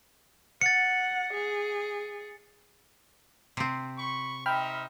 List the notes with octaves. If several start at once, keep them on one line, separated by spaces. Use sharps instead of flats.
F#5 A6 C#7
G#4
C3 C4
B5 C#6
D#4 C5 E5 G5 B5 F6